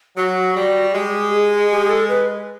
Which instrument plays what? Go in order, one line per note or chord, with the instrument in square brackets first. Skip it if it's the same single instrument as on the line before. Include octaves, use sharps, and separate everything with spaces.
[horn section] F#3 [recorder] F#4
[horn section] G3
[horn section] G#3 [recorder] G4
[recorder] G#4
G4
A4
B4